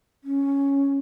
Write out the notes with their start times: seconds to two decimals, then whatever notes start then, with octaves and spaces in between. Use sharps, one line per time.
0.24 C#4